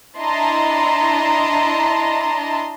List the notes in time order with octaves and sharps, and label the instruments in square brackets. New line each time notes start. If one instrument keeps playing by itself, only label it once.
[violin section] D4 E4 D#5 A5 A#5 C6